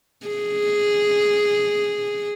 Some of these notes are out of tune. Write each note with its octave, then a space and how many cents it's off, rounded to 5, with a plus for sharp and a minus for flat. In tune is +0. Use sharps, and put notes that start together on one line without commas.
G#4 -5